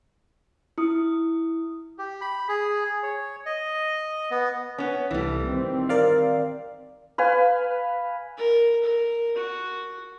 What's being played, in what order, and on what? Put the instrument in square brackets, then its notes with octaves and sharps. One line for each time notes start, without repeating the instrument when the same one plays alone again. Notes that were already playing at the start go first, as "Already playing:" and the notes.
[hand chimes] E4 D#6
[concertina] G4
B5
G#4
C#5
D#5
B3
[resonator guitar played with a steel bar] B3 C#4
[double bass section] C2 A3 [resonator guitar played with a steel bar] E3 G3
[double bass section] D#3 C4
[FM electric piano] A#4 D5 F5
[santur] B4 F5 G#5
[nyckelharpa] A#4
A#4
F#4